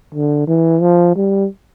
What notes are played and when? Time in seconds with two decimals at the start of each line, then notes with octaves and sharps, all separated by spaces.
0.15 D3
0.47 E3
0.81 F3
1.16 G3